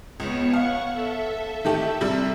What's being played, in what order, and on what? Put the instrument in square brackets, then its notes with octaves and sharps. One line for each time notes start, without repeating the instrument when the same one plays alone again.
[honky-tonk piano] C#2 [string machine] B3 C#5
[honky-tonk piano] F5 [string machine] F#5 C#6
[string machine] A4 E5
[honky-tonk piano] D#3 A3 G4
C3 G3